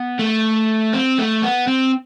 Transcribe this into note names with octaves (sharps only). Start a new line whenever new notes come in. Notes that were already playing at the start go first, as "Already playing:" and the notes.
Already playing: B3
A3
C4
A3
B3
C4